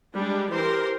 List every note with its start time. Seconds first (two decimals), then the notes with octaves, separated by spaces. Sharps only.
0.17 G3 G#3 D4
0.51 E3 G4 A#4 C5 C6